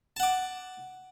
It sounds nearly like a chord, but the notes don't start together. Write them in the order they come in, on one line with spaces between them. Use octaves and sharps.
A5 F#5 D6